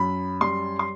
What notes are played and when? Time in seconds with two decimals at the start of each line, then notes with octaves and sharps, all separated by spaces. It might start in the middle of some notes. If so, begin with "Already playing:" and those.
Already playing: F#2 B5
0.41 G3 C6
0.79 C6